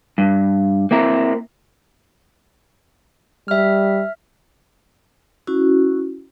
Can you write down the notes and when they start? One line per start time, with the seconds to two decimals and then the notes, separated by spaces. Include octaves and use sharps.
0.18 G2
0.91 A#3 C4 E4 A#4
3.48 G3 E5 F6
5.47 C#4 E4 F#4